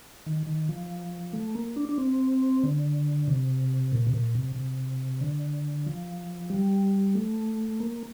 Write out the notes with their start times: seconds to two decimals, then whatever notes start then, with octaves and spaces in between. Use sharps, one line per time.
0.26 D#3
0.47 D#3
0.68 F3
1.33 A3
1.55 A#3
1.76 D4
1.89 D4
1.98 C4
2.63 D3
3.28 C3
3.92 A#2
4.07 C3
4.13 A#2
4.35 C3
4.56 C3
5.21 D3
5.86 F3
6.50 G3
7.15 A3
7.80 A#3